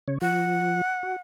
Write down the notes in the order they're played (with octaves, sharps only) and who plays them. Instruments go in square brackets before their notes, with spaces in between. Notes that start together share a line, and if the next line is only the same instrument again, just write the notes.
[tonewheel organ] C#3 C#5
[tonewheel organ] F3 [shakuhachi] F#5
[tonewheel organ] F#4